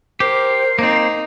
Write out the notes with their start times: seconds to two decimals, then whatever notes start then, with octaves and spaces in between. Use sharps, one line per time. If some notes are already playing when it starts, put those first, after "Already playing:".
0.20 G4 A#4 C5 C7
0.79 A#3 C4 D#4